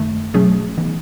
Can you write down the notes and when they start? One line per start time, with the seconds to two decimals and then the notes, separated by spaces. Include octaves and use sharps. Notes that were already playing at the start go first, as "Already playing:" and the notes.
Already playing: F#2 D#3 A3
0.34 B2 F#3 A3 C#4 G#4
0.77 E3 B3 D#4